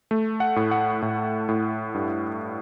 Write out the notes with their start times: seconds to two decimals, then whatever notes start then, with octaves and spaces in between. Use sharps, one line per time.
0.11 A3
0.40 F#5
0.56 A2
0.71 F#5
1.02 A2
1.49 A2
1.94 G2